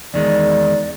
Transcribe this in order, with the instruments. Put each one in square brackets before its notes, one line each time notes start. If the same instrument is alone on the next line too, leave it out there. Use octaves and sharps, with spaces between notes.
[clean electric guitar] E2 D#3 G#3 [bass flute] D5